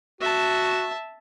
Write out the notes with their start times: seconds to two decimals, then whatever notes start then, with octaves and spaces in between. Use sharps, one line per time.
0.21 F#4 E5 A5